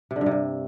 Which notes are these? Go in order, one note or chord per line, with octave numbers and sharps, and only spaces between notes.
C3
D3
G2
C3
G2